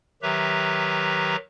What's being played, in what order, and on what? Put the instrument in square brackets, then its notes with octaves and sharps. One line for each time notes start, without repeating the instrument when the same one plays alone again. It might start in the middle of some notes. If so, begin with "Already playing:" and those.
[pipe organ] D#3 F#3 G4 B4 E5 A#5